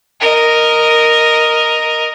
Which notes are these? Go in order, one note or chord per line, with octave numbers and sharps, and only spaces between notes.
A#4 D#5